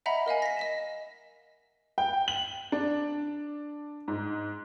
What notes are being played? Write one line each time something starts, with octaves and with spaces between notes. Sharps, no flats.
D#5 E5 F#5 A#5 B5
A#4 D#5 F5 G#5
A#6 B6
D#5 B6 E7
G5
F#7
D4
G#2